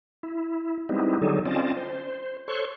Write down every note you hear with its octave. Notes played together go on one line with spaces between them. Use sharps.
E4
G3 G#3 B3 C4 D#4 E4
D3 F#3 G3 D#4 G#4 A4
C4 C#4 F4 D5 D#5 A5
C5
A4 C5 C#5 C6 C#6 F#6